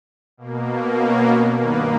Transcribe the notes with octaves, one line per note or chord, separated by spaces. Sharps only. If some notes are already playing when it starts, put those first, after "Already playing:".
B2 A#3
C#4 C#5
G2 D#3 A#3 B3 B4